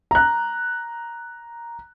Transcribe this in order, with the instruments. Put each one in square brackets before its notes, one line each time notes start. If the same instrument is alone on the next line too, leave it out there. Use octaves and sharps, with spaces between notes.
[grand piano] A#5 F#6